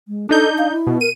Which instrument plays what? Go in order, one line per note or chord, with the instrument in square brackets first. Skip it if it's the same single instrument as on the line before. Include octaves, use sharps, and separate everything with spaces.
[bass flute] G#3
[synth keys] D4 D#4 G6 [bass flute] A4
[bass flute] F5
E4
[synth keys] B2
[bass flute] A#4 [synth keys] D#7